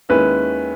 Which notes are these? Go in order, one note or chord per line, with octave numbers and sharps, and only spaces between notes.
D#2 D#3 G#3 C#4 E4 B4